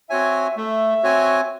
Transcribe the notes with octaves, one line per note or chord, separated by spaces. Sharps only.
C4 F#4 C#5 E5 G#5
A3 E5
C4 F#4 C#5 G#5